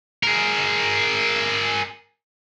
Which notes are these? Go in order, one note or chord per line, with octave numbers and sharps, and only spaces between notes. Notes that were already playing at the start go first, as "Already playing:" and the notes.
G#4 A#4